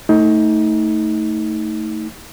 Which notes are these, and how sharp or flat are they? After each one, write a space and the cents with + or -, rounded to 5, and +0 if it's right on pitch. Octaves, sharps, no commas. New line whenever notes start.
A3 +15 D#4 +25